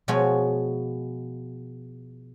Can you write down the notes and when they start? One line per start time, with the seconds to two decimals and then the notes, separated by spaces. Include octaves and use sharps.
0.08 B2 F3 G#3 B3 F#4 C#5